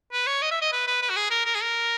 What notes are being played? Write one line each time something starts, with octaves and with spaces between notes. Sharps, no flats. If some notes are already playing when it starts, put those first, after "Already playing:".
B4
C#5
D#5
E5
D#5
B4
B4
B4
F#4
G#4
A#4
A#4
G#4
A#4